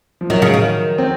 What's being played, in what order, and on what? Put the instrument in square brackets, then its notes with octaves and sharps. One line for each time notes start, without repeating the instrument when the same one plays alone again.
[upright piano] F3
[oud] D#3 [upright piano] F#3
[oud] C#3
D#3
[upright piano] C4